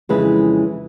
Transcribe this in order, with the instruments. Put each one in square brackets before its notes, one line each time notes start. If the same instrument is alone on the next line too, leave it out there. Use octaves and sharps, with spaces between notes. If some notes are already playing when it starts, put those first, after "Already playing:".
[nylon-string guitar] F2 C#3 E3 G#3 B4